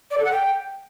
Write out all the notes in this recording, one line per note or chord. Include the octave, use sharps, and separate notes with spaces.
D5
A4
F#5
G5